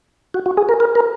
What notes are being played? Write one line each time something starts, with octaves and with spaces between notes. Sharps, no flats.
F#4
F#4
G#4
A#4
A#4
A#4